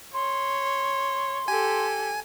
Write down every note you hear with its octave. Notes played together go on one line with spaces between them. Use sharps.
C#5 C6
G4 A4 G#5